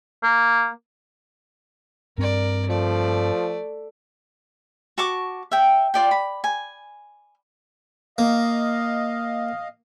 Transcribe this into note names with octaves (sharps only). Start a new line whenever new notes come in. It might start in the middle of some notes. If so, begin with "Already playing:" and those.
A#3
G2 C4 A#4 D5
F3 A3 D5
F#4 A5 C#6 D6
E5 G5
F4 D5 G5
B5
G#5
A#3 D#5 F5